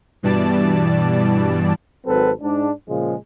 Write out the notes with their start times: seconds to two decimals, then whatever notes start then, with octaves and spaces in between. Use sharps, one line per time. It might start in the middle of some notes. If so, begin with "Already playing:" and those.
0.23 G2 B2 E3 G3 D5 A5
2.05 G#1 F#3 C4 A4 B4
2.41 G#2 D4
2.88 A#2 C#3 F3 G#3